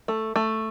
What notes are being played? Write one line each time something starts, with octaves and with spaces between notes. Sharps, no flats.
A3
A3